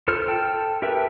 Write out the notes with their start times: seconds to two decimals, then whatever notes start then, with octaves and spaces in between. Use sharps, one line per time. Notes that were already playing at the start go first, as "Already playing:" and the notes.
0.08 F4 A4 C5 F6
0.28 A4 G5 A5
0.82 G4 A#4 B4 E5 G5